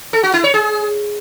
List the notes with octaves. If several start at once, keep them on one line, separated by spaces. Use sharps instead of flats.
A4
F#4
E4
C#5
G#4